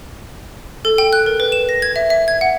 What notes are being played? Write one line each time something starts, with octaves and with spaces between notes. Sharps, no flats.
A4
G5
F#6
A#4
B4
E7
A#6
G#6
E5
E5
G#6
F#5